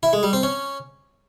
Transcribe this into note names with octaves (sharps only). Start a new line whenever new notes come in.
E4
G#3
G3
C4
C#4